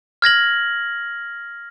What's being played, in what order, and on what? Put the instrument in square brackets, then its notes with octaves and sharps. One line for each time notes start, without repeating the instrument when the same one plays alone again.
[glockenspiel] F6 G#6 A#6 F#7